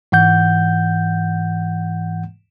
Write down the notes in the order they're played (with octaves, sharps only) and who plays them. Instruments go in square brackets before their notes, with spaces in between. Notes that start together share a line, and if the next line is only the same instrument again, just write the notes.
[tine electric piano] G#2 E3 F#5 G6